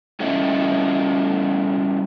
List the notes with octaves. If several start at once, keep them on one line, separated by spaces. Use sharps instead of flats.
G3 C#4 E4 A4 D#5 E5